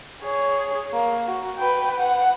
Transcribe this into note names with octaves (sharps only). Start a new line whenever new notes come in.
G#4 C#5
A#3
F#4
B4 G5
F#5